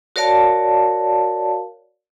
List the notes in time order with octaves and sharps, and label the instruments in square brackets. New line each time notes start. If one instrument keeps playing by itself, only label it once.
[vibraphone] F#4 A#4 C#5 D5 F5 A5